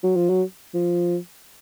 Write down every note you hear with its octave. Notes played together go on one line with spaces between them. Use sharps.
F#3
F3
F#3
F3